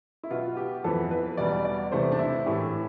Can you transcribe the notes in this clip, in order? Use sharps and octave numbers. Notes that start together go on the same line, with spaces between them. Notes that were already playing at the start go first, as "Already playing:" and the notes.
E4
B2 B3 F4
G4
F2 E3 B3 A4
B4
E2 B2 G3 B3 D5
D5
C3 E3 A3 C5
D4
E4
A2 E3 A3 G4